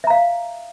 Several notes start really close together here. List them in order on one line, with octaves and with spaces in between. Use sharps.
E5 A#5 F5